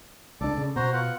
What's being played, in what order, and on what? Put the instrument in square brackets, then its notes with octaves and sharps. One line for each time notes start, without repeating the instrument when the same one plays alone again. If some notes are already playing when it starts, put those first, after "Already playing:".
[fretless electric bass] C#2 D4 [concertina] A4 D5
[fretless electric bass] C#3
[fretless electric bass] B2 [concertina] F#4 C5 A#5
[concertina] B3 F4 F#5